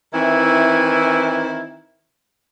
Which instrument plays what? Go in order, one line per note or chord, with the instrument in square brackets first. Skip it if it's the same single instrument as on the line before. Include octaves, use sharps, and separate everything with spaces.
[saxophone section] D#3 E3 C4 E4